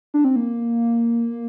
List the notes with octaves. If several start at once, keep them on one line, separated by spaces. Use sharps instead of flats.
D4
C4
A#3